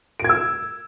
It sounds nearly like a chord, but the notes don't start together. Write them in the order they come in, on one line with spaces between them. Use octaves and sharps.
D7 G#6 E6